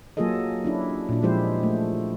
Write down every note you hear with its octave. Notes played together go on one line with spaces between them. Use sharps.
F#3 A#3 F4 G#4 A4 D#5
C#4 D4 E4
A#2 D4
F3 G#3 E4 G4 C5
A3